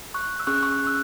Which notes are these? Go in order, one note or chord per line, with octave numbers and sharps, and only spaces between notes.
C#6 F#6
E6
C#4 G#4 C#6 F#6
C#6 F#6
F#6
E6